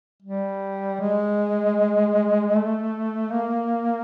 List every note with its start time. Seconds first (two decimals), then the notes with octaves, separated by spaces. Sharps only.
0.22 G3
1.01 G#3
2.56 A3
3.33 A#3